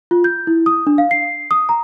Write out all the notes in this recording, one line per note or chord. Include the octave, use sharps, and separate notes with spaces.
F4
G6
E4
D#6
D4
F5
C7
D#6
A#5